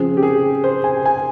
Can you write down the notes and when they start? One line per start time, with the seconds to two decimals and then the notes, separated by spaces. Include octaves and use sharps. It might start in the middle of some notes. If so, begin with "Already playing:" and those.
Already playing: C#3 F3 C4 G#4
0.17 G4
0.23 G#4
0.64 C5
0.84 G#5
1.05 G#5